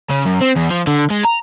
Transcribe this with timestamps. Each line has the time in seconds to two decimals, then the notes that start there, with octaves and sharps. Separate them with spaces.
0.10 C#3
0.25 F#2
0.42 C4
0.56 E2
0.71 F3
0.87 D3
1.10 G#3
1.24 A#5